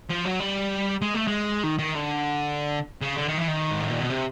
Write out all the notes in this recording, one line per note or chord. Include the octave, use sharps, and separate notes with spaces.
F3
F#3
G3
G#3
A3
G#3
D#3
D#3
D3
C#3
D3
D#3
E3
D#3
G#2
A2
A#2
B2
C3